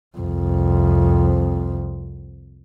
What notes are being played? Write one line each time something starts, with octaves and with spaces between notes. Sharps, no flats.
C2 F2